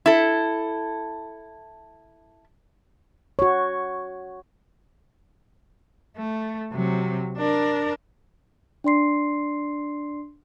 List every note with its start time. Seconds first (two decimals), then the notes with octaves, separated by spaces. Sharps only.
0.06 E4 A4
3.39 F#4 C#5
6.17 A3
6.72 C3 F#3
7.38 D4 A#4
8.84 D4 D5 C6 C7